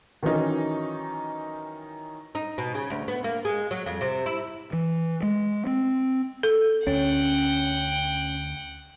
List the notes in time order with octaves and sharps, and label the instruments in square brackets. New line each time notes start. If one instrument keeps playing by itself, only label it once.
[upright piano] D#3 E3 F#3 C#4 D#4
[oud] D#4
B2
C#3
D2
B3
A#3
G#3
F#3
F2
C3
E4
[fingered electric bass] E3
G#3
C4
[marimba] A4
[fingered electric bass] D2 [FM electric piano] C#4 [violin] F#5 G5